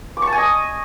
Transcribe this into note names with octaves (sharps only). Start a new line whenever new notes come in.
D6
C#6
A5
G#5
D#5